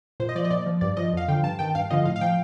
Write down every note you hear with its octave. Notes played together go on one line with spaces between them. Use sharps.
A#2 C5
D#5
F3 D5
D#5
A#2 D5
F3
G2 D5
F3 D#5
F2 F5
D3 F3 G5
G2 A5
D#3 G5
G2 F5
D3 F3 D#5
A2 F5
F5
F3 G5